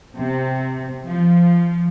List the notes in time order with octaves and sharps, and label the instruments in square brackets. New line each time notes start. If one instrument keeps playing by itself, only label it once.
[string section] C3
F3